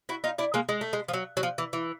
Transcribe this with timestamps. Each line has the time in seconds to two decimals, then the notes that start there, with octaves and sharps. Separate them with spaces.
0.09 E4 F#4
0.24 D#4 F4
0.38 D4 E4
0.54 G#3 A#3
0.69 G#3
0.81 A3
0.93 G#3
1.08 F3
1.13 F#3
1.37 F#3
1.43 F3
1.58 E3
1.73 E3